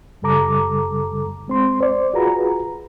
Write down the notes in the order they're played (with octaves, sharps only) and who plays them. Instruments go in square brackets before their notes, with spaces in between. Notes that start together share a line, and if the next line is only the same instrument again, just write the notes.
[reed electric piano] F#2 C#3 G3 A4 A#5 D6
G#3 C4 C6
C5 D5
F4 F#4 G#4 B4 A#5